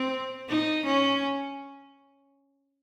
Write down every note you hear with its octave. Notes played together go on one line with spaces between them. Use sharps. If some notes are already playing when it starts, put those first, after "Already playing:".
Already playing: C4
D#4
C#4